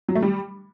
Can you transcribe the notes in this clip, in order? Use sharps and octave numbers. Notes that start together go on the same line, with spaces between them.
F#3
A3
G3